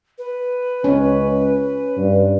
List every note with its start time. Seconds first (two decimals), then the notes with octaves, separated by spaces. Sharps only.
0.18 B4
0.84 C#2 C#4
1.97 G2